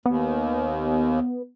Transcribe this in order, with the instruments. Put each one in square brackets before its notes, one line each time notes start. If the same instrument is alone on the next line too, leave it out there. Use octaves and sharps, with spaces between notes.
[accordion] D#2 [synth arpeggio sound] B3